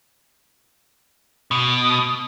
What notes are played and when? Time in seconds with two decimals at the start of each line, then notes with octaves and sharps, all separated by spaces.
1.51 B2